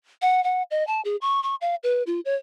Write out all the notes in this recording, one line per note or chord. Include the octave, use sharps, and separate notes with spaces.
F#5
F#5
D#5
A5
G#4
C#6
C#6
F5
B4
F4
C#5